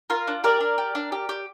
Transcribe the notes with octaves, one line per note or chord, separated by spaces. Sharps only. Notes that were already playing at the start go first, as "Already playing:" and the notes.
F4 A#4
D4
G4 A#4 D5
D4
G4
D4
G4
G4